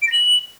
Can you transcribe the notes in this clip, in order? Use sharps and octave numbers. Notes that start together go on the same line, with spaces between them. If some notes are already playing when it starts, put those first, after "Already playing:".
D7
A#6
F#7